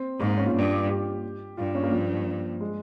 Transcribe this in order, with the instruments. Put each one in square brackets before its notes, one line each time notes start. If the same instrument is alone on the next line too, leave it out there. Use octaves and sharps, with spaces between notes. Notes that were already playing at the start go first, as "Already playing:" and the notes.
Already playing: [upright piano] C4
[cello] G#2 [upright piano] A#3
[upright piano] C#4
F4
[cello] G2
[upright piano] G4
[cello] G2 [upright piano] F4
[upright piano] C#4
A#3
F3
G#3